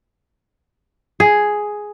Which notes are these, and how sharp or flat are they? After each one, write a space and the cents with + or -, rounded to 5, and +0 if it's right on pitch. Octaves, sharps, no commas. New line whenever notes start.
G#4 +5